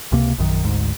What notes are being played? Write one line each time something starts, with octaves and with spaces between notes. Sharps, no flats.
C#2 C3 A#3
A#1 F#2 D#3
G#1 D2 G#2